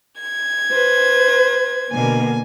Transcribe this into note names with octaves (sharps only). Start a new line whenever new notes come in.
G#6
B4 C5
B2 D3 A#3 G#5